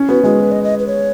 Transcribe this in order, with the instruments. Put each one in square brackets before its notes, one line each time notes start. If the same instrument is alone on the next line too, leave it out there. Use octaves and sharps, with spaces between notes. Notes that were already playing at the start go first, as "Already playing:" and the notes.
Already playing: [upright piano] C#4
[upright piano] B3 [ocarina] F#4
[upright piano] G#3 [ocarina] F#4
[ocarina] B4
D#5
D#5
B4
C#5